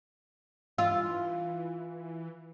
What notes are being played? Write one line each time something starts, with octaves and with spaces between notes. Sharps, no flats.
E3 F4 E6